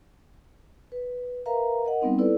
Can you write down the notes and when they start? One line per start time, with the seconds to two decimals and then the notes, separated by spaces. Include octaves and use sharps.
0.92 B4
1.46 A#4 B4 E5 F5 A#5
1.85 A#4 D#5 F#5
2.02 G3 B3 C4 D#4
2.18 E4 A4 B4 D5